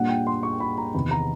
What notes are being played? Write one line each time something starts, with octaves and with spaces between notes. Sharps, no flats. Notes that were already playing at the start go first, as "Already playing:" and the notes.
Already playing: A#2 G3 A#3 D4 F#5
G5
C6
C#6
B5
A#5
E2 C3 D#3 B5
A#5